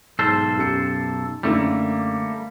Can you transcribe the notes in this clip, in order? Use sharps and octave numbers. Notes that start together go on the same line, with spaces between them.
B1 G#2 A4 C5 F6
F#2 G4 C#7
F#2 D3 G3 A3 A#3